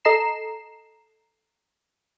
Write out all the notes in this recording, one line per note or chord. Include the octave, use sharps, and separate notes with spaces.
A4 D#5 A#5 C7 E7